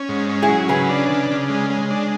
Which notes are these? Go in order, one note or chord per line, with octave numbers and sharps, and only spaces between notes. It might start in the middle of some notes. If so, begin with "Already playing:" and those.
Already playing: C#4
G#2
C#4
E4 G#4
F#3
C#3 G#4 B4
D4
C#3
C#3
G#3
G#3
D4